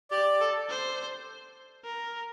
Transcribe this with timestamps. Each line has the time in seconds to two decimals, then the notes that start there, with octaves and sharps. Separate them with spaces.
0.11 G4 D5
0.41 A4
0.69 C5
1.84 A#4